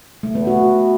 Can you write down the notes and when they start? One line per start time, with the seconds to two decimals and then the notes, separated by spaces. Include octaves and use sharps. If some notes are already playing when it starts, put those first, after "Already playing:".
0.23 A3
0.35 B3
0.47 F#4